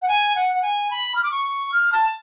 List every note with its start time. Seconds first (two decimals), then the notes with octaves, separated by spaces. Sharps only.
0.02 F#5
0.08 G#5
0.36 F#5
0.54 F#5
0.62 G#5
0.91 B5
1.15 F6
1.23 D6
1.31 C#6
1.72 F6
1.92 A5